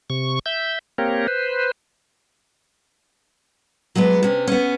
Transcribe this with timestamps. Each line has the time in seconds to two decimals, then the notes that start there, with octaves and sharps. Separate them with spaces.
0.10 C3 C#6
0.46 E5 G6
0.98 A#3 C4 G4 A#4 C#5
1.28 B4 C5
3.95 F#3 G#3 B3 B4
4.23 C3 C#4 D4
4.47 B3 C#4